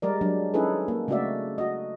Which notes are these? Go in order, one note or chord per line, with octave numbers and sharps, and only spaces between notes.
G3 G#3 A#4 D5
F#3 G#3 D4
C#4 D#4 E4 G#4 A4 B4
A#3
C#3 G#3 A3 F#4 D5 E5
F#4 D#5